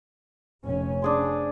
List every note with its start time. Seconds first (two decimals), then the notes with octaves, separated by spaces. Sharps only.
0.64 F1 C#4
1.02 D4 G#4 C5